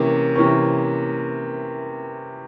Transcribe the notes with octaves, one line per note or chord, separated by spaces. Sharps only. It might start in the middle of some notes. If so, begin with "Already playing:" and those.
Already playing: C3 E3 A#3 C#4
C3 E3 A#3 C#4